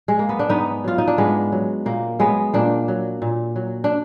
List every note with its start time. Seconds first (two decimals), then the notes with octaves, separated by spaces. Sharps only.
0.08 G#3
0.19 A#3
0.29 B3
0.39 D4
0.49 G#2 B3 D#4
0.84 F#3 F4
0.98 D#4
1.08 D4
1.18 G#2 G#3 B3
1.52 F#3
1.86 A#2 A#3
2.19 F#3 G#3 B3
2.54 A#2 A#3 D4
2.88 F#3
3.22 A#2
3.56 F#3
3.84 D4